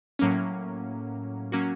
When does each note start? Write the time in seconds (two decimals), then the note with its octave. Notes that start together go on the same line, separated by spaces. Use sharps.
0.19 A2 F#3 A#3 C#4
1.52 F#3 A#3 C#4 F#4